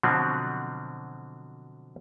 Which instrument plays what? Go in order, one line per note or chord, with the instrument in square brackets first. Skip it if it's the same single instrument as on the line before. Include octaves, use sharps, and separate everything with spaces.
[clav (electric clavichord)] B2 D3 F3 F#3 C4